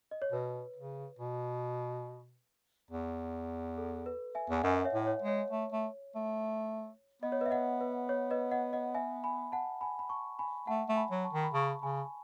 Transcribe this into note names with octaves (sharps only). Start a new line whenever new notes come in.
D#5
C#5
B2 B4
C#3
B2
E2
A4
B4
E5 G#5
E2
G#5
F#2 D#5 F#5
C#5 E5
A2
C#5
G#3
C#5
A3
A3
A3
B3 D#5
C#5
B4 D#5
E5
D#5 F#5
B4
C#5
B4 D#5
D#5 F#5
D#5 F#5
E5 G#5
G#5 B5
F#5 A5
G#5 B5
B5
A5 C#6
G#5 B5
A3 F#5 A5
A3
G#5 B5
F#3
A5 C#6
D#3
B5
C#3 A5 C#6
C#3 G#5 B5